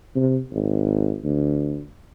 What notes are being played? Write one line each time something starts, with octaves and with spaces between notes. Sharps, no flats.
C3
G#1
D2